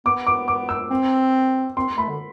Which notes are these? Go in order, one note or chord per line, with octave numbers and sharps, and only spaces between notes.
B3 D6
D6
D6
E6
C4
C4 C6
A3 B5
D3